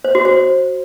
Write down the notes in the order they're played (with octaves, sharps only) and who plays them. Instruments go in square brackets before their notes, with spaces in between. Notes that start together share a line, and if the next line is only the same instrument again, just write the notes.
[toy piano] C5
F#4
C5